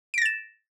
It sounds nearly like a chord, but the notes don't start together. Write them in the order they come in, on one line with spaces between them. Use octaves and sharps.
D7 A#6 A6 E7